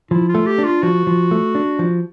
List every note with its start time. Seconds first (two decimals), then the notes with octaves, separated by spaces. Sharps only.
0.11 F3 E4
0.29 F4
0.35 A3
0.47 G4
0.58 D4
0.64 F4
0.83 F3 F#4
1.07 F3
1.31 A3
1.55 D4
1.79 F3